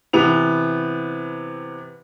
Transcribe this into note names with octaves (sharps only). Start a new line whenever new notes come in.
C3 E3 B3 F7